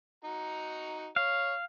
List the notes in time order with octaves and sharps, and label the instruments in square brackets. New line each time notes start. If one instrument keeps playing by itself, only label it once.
[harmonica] D#4 F#4 A#5
[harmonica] C#5 [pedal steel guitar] F5